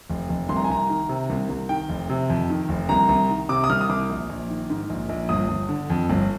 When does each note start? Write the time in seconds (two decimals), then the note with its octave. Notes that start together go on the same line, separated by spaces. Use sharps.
0.10 F1
0.29 F1
0.49 C2 C6
0.57 A#5
0.64 G#5
0.70 C2 A#5
0.90 D#3
1.09 C3
1.30 C2
1.49 C2
1.69 D#3 G5
1.89 F1
2.09 C3
2.30 F2
2.50 D#3
2.69 F1
2.89 C2 A#5
3.09 C2
3.29 D#3
3.49 C3 D6
3.64 D#6
3.70 C2 F6
3.81 D#6
3.90 C2 D6
4.10 A#1
4.29 A#1
4.49 D#3
4.70 G#2
4.90 A#1
5.09 A#1
5.29 G1 D#6
5.49 G1
5.69 D3
5.90 F2
6.10 G1